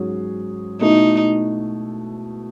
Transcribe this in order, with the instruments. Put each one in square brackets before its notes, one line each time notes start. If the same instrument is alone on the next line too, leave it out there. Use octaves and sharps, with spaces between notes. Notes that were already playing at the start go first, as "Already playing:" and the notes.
Already playing: [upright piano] G#2 F#3 C#4 G#4
[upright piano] B2 A3 E4 [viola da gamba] D#4